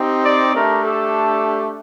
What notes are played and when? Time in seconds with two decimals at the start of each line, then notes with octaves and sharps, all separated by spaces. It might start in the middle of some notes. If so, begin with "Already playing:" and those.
Already playing: C4 D#4 G4
0.25 D5
0.54 A3 D4 G4 A#4
0.84 A4